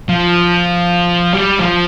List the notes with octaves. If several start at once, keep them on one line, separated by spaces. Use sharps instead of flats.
F3
G3
F3